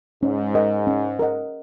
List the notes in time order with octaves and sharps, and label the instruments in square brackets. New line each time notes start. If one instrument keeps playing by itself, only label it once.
[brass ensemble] G#2 [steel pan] C#4
[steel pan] A#4 D#5 F#5
C#4
A#4 D#5 F#5